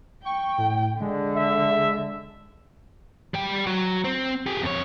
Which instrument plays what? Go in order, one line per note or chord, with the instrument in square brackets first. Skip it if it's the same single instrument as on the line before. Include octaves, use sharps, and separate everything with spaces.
[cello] G5 [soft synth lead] C#6
[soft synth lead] A2
[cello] D3 [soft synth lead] G#3
[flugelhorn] E5
[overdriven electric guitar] G3 G5
F#3
C4
G4 G#4
F2 C#5